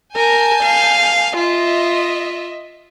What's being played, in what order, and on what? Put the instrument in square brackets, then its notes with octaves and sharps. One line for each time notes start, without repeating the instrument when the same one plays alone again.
[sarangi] A#4 [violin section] G#5 A5 G6
[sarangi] F5
[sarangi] F4 [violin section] D#5 E5